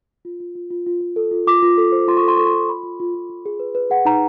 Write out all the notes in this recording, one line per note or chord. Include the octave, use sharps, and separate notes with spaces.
F4
F4
F4
F4
F4
F4
A4
F4
F4 D6
F4
A4
C5
F4 C6
C#6
A4
C6
A4 C#6
C6
F4
F4 B5
F4
F4
F4
F4
G#4
B4
B4
G#4 F#5
D#4 A#5